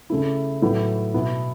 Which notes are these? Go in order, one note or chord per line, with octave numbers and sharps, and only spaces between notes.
C#3 A3 E4
A2 F#3 B3
B2 B3 E4